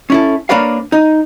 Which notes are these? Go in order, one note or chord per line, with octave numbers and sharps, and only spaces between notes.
C#4 E4 A4
A#3 D4 A#4 B4 C#5 F5
D#4